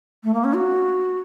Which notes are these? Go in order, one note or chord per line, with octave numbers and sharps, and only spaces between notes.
A3
A#3
C#4
F#4